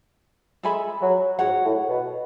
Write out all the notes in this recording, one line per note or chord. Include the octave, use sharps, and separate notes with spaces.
G#3 A4 E5 G#5 B5
F#3
G#2 F#4 C#5 F#5
A2
B2